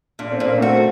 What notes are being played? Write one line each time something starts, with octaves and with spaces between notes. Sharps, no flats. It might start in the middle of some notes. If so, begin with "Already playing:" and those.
A#2 D4
C4
A#2 A#3
A3 C4 F#4